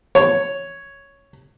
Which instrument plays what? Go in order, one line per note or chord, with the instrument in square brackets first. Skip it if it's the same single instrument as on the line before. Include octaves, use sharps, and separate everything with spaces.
[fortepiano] C#5